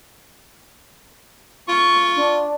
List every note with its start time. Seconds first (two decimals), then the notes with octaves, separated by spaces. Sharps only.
1.68 F4 C#6
2.16 D4